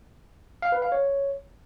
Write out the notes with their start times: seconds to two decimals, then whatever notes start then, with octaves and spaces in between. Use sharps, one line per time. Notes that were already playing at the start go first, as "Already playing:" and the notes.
0.62 F5
0.72 B4
0.82 F5
0.92 C#5